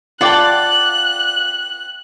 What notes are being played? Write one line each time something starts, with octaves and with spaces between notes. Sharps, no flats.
F4 D5 F#5 G5 A5 F#6